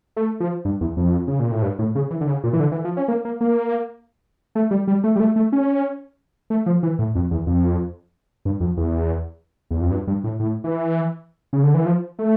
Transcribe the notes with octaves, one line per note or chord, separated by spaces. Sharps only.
A3
F3
G2
E2
F2
C#3
A#2
A2
G2
A2
C#3
E3
D3
C#3
A#2
E3
D3
E3
F3
C#4
A#3
A#3
A#3
A3
G3
G3
A3
G3
A3
A3
C#4
A3
F3
E3
A2
F2
E2
F2
G2
F2
E2
E2
F2
G2
G2
A2
A2
E3
C#3
D3
E3
F3
A3